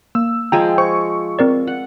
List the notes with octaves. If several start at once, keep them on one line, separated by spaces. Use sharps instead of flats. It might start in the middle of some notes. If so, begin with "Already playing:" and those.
A#3 E6
F3 G#3 G5 G#5 A#5
C5 C#6
C4 A#4 D5
F#5